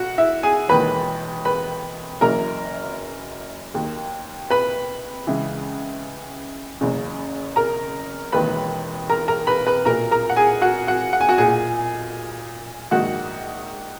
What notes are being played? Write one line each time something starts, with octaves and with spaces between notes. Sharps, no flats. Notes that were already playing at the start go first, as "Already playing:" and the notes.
Already playing: B1 F#4 F#5
E4 E5
G#4 G#5
E1 D#2 D#3 B4 B5
B4 B5
F#1 F#2 E3 A#4 A#5
D#2 D#3
B4 B5
C#2 C#3 E3
F#1 E2 C#3
A#4 A#5
E1 D#2 D#3 B4 B5
A#4 A#5
A#4 A#5
B4 B5
B4 B5
B1 A#2 A#4 A#5
A#4 A#5
F#5
G#4 G#5
F#4 F#5
F#4 F#5
F#5
G#5
F#4 F#5
B1 A#2 G#4 G#5
A#1 G#2 D#3 F#4 F#5